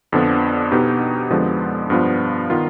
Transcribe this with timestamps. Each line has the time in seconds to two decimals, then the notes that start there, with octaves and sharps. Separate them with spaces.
0.12 F2 D3 F3 B3 D4
0.72 B2 B3 D#4 G4
1.31 F2 D3 F3 G#3 B3
1.90 G2 F3 B3 F4
2.50 D#3 B3 F4